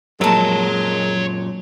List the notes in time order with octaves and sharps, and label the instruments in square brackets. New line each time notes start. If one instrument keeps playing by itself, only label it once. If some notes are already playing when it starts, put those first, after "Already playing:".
[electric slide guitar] F#2 A#2 [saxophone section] G#3 [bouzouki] A#4 A5 [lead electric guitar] C#5 A#5